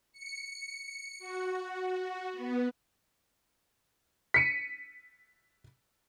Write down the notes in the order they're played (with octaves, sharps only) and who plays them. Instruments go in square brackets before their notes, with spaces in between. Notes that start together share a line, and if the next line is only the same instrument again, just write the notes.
[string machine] C#7
F#4
B3
[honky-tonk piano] B6 C#7 D#7